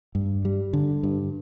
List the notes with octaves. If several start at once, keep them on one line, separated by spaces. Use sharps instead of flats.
G2
G3
D3
G2